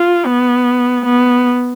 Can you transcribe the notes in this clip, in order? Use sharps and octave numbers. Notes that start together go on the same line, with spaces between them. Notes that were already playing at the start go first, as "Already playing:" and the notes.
Already playing: F4
B3
B3